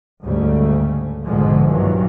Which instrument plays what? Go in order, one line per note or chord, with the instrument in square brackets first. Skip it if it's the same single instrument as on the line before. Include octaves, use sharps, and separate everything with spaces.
[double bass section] D2 G#2 C#3 G3 A3
A#1 G#2 B2 D3 F3 G#3
G2 A#2 D#3 E3 F#3